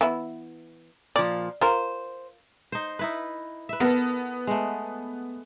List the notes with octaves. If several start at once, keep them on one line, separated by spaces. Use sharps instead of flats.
E3 B3 E4
A#2 F3 D5
F4 A#4 C5
D#4 C5
D#4 E4 B4
B4 E5
B3 A4 A#4
G#3 A3